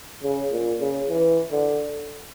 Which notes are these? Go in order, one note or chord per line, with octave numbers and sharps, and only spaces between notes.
C#3
A#2
C#3
E3
D3